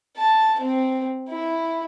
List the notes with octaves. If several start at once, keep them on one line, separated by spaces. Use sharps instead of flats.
A5
C4
E4